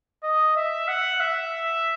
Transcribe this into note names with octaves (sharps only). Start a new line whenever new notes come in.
D#5
E5
F#5
E5